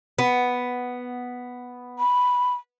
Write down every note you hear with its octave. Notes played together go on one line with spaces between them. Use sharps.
B3
B5